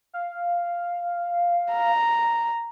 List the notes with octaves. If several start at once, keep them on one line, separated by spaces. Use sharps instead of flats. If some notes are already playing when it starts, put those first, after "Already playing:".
F5
A#5